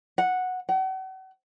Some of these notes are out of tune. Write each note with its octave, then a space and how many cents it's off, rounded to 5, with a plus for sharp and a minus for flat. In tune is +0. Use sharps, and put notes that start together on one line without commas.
F#5 -5
F#5 +40